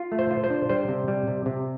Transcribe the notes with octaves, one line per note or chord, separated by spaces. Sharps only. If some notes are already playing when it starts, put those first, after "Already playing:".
Already playing: F4
A3
C5
F4
C5
D4
G3 C5
C3
G3
C3
C3